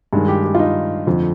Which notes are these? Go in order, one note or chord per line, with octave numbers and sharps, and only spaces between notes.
G2 D#3 G#3
G4
G4
F4
D#4
F2 D3 F3